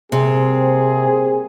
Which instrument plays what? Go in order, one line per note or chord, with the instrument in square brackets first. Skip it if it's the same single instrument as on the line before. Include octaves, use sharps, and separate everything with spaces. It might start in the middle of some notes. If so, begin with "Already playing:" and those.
[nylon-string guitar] C3 [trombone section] G3 A#3 C4 [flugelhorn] G#4